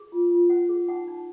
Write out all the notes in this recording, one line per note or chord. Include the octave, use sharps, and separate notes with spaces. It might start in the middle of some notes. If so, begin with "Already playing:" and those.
Already playing: G#4
F4
F4
C5 F#5
G#4
D#4 F#5
D#4